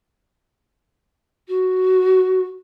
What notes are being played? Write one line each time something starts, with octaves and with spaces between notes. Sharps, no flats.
F#4